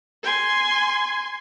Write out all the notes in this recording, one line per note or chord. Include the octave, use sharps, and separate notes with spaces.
G#5 C6